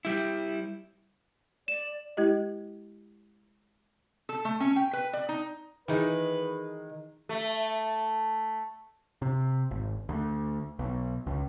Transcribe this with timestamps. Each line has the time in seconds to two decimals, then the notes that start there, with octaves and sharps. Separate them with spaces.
0.05 G3 E4
1.68 D5 E7
2.17 G#3 E4 G4 D#5
4.29 A4
4.45 A3
4.60 C#4
4.76 G5
4.93 B4
5.13 D5
5.29 D#4
5.88 D#3 E3 G#3 D#4 B4
7.29 A3
9.22 C3
9.71 G#1
10.09 D2
10.79 B1
11.27 C#2